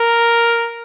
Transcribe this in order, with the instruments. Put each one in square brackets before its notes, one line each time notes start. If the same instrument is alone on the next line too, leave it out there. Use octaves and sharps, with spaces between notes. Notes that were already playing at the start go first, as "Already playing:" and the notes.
Already playing: [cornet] A#4